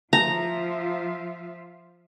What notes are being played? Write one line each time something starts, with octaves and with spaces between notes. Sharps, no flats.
F3 F4 E5 A#5